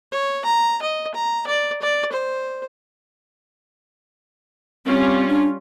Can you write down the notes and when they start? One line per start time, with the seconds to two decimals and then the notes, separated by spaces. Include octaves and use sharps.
0.12 C#5
0.45 A#5
0.82 D#5
1.15 A#5
1.47 D5
1.82 D5
2.12 C5
4.86 G3 C4 C#4 F4
5.28 D4